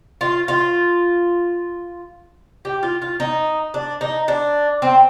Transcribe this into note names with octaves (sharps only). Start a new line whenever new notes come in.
F4
F4
G4
F4
F4
D#4
D4
D#4
D4
C4